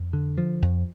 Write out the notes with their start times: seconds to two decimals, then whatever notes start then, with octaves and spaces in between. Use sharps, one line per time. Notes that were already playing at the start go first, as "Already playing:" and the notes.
Already playing: F2
0.13 D3
0.38 F3
0.62 F2